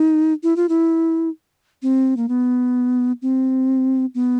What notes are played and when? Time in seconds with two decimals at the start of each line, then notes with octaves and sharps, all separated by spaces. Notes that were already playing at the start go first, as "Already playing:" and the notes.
Already playing: D#4
0.43 E4
0.56 F4
0.69 E4
1.82 C4
2.17 A#3
2.29 B3
3.22 C4
4.15 B3